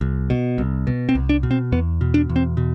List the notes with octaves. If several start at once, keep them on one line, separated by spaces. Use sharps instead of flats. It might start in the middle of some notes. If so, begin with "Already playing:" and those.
C2
B2
C2
B2
C4
C2
D4
B2
C4
E2 B3
B2
D4
E2
C4
B2